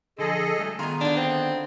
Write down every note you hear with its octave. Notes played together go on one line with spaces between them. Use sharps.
D3 F3 G#4 A4 D#5
F#3 G3 A3
D#3 B3 F4 G#4 G#5 A#5
D3 D4 D#4
C4